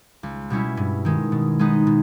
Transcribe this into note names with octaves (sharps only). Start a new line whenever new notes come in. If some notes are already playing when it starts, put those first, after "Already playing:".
C#2
B2 G3 C#4 E4
G2
D#3 G#3
B2
G#3 B3 D#4
B2